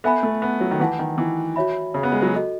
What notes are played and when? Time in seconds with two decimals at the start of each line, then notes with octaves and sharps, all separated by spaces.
0.04 B3 A4 E5 G#5 B5
0.23 A3
0.42 B3
0.61 F#3
0.71 D#3
0.80 E3 B4 F#5 A5
0.99 D#3
1.18 E3
1.56 F#4 C#5 E5 B5
1.94 C#3
2.03 B3
2.12 G#3
2.22 F#3
2.32 F#4 A4 D#5